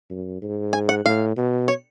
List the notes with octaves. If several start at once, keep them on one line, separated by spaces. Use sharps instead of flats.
F#2
G#2
G#5
F#5
A2 F5
B2
C#5